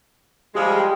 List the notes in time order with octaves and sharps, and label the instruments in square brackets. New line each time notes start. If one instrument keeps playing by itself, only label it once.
[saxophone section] F3 G3 G#3 [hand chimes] G4
[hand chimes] G#4 G5